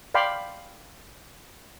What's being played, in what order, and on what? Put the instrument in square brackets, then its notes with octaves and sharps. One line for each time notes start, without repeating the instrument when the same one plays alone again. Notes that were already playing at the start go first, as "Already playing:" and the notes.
[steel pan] D5 F5 G5 B5 C6